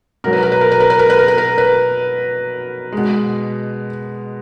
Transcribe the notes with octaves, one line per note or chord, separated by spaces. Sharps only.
B2 F#3 A#4
B4
A#4
B4
A#4
B4
A#4
B4
A#4
B4
A#4
B4
A#4
B4
G#3
B2